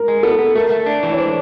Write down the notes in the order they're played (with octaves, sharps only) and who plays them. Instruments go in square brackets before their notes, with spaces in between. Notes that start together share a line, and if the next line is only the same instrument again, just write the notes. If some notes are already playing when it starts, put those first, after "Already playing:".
Already playing: [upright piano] A#4
[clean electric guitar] G#3
[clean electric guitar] B3 [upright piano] A4
[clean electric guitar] B3
[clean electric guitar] A3 [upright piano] A#4
[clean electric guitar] A3
D4
E3
[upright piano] C#5
[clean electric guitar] D4 [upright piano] C5